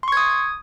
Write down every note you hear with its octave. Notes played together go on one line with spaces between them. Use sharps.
C6 C#6 D#6 G#6